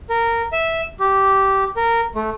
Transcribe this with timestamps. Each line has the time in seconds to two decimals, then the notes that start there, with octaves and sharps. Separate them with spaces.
0.10 A#4
0.53 E5
1.00 G4
1.76 A#4
2.15 A3